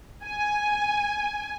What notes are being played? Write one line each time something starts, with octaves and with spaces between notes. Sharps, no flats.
G#5